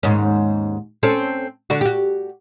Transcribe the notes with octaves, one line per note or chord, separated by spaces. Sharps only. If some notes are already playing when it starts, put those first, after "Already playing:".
D#2 G#2 C#4
C4 C#4 A4
D3 D4 F#4
F#4 G4